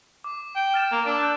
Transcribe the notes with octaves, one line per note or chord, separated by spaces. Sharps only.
D6
G5
F6 A6 E7
A#3
D4 E6 D7
F#6 G6